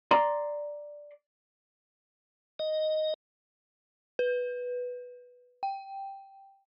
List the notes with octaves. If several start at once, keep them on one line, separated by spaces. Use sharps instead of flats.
D5 A#5 C6
D#5
B4
G5